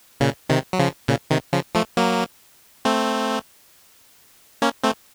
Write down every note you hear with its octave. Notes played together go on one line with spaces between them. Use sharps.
A#2 C#3
C3 D#3
F#3
C#3 F3
A#2 C#3
C3 D#3
C#3 F3
F3 A3
F#3 A#3
A3 C4
A#3 C#4
A3 C4